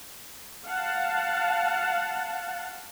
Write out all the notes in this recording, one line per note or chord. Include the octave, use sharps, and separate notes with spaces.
F5 F#5 A5